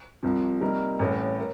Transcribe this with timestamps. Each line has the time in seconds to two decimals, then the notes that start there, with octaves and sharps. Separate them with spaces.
0.23 C2 C3 F3
0.61 C3 G3 A#3 D#4 A#4
0.99 A1 A2 G3
1.38 A#4